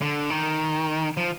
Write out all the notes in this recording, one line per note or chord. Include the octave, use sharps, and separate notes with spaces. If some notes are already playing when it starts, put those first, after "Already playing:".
D3
D#3
F3